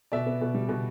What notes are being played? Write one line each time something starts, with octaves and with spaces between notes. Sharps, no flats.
B2 D5 E5
B3
B2
G3
B2